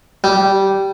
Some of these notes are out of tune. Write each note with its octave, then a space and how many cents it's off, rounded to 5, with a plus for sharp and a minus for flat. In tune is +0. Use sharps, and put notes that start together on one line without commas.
G3 -15